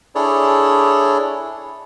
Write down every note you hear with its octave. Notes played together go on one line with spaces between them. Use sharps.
D4 E4 G#4 A4 C#5 D5